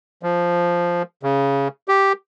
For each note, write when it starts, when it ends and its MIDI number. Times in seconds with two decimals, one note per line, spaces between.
0.23 1.02 53
1.23 1.68 49
1.88 2.12 67